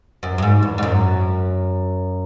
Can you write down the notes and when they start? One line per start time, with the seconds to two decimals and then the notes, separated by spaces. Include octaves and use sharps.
0.23 F#2
0.38 F#2
0.42 G#2
0.62 E2
0.78 G#2
0.83 F#2